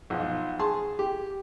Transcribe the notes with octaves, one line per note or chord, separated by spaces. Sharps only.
B1 F3
G#4 A5 C6
G4